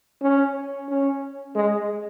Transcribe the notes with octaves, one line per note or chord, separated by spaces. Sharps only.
C#4
C#4
G#3